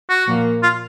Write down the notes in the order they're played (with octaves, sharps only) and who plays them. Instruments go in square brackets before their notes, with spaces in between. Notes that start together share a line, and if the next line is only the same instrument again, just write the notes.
[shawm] F#4
[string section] A#2 F3 A#3
[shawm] F4